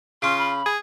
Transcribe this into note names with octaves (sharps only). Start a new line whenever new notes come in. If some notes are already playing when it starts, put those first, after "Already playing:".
C#3 C#4 F4 C6
B5
G#4